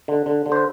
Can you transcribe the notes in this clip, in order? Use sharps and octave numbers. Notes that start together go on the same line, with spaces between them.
D3
D3
D3
C5